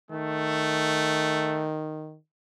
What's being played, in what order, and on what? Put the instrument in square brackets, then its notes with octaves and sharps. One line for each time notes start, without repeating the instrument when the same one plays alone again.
[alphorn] D#3 [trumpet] A3